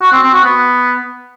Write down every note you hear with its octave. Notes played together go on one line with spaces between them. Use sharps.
F#4
C4
C4
F#4
B3